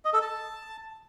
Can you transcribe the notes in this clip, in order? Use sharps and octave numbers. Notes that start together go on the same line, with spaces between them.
D#5
A4
A5